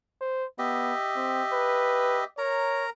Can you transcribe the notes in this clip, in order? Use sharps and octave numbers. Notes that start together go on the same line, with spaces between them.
C5
B3 G4 D#5 E5
C4
B4
A#4 C#5 A#5